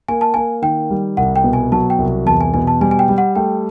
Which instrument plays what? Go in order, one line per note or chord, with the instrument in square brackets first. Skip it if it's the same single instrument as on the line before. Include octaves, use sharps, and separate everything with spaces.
[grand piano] A#3 [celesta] G#5
[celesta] A5
[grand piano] A#3 [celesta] G#5
[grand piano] D#3 [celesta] G5
[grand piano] G3
[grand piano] C2 [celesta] F#5
[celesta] G5
[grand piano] B2
[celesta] G#5
[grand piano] F#3 [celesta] A5
[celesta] G5
[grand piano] C2
[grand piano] E2 [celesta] A5
[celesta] G#5
[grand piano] B2 [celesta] G#5
[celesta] A5
[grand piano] G3 [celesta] G#5
[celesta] G#5
G5
[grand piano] G3
[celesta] F#5
[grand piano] A3 [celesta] G5